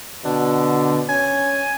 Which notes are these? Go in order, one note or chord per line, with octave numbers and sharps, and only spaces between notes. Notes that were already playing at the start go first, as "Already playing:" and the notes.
B2 D3
C#4 G#5